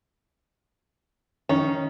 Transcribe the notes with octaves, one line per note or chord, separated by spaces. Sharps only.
D#3 C#4